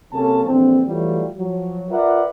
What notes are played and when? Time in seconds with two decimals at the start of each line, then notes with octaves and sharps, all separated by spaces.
0.13 C3 F#3 A#3 C#4 A4 A5
0.45 A#1 D3 E3 C4
0.88 E3 F#3 G3 A3 F4 F#4
1.36 F3 F#3
1.90 F4 A#4 B4 D5 E5 F#5